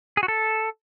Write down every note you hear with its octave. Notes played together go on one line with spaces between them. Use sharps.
G#4
F#4
A4